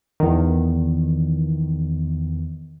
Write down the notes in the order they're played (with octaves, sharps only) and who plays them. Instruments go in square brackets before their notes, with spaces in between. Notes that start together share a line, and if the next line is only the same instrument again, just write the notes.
[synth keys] E2 D#3